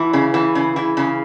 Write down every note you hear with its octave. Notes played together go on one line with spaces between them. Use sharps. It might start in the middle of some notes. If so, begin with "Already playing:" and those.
Already playing: E3
C#3
E3
C#3
E3
C#3